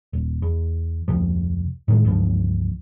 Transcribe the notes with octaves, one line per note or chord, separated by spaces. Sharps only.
D#1
E2
F1 D2 C3 F3
A2 D#3 F#3 G#3
C#2 G2 E3 F3